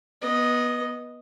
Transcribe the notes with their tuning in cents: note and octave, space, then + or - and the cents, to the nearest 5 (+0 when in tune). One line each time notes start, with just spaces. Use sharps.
B3 -20 D#5 +0